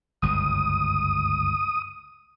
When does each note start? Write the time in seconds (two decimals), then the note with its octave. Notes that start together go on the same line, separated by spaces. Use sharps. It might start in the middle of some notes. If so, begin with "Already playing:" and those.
0.22 G1 C#2 F#2 D#6